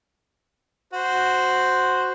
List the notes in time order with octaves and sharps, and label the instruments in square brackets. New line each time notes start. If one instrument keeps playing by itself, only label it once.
[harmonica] F#4 C5